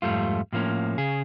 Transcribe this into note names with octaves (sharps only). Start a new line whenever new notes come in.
F2 G#2 G3 A3 F4
A2 F3 A#3 C#4
C#3 G#4